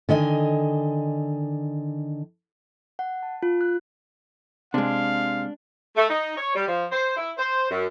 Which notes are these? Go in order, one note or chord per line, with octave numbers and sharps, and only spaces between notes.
D3 D#3 D#5 G#5
F#5
A5
F4
F#6
C3 G#3 D4 F5
A3
D#4
C#5
G3
F3
C5
E4
C5
F#2